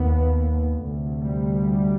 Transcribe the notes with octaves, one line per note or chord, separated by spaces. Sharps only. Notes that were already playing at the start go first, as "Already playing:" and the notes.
Already playing: D#2 B3
D2 C3
G3